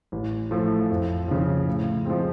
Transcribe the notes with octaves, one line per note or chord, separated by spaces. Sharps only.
A1
A2 F3 A3
F2
C#3 F3
A2
F3 G#3 C4